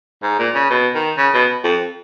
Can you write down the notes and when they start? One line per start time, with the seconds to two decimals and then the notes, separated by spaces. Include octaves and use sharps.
0.23 G#2
0.39 A#2
0.55 C#3
0.70 B2
0.95 D#3
1.18 C#3
1.34 B2
1.64 F2